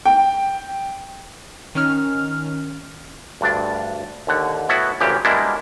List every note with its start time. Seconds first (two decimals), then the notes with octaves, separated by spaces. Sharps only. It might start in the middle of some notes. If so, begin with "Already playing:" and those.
0.06 G5
1.75 D#3 C#4 F6
3.41 D2 G2 D4 D5
4.27 D#2 D3 F#5
4.69 A2 B3 E4 F#4 A4
5.00 D2 A#2 C#3 E3 G4
5.25 B2 G3 G#3 A#3 D4 E4